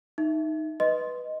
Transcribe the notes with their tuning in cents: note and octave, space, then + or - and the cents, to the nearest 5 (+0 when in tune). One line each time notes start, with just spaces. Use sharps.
D#4 +0 E5 +5
B4 +0 D#5 +0 C6 +0